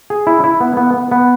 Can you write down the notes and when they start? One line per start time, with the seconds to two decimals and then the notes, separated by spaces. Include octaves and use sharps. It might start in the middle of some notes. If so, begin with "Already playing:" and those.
0.10 G#4
0.27 E4
0.44 E4
0.60 B3
0.77 B3
0.94 B3
1.11 B3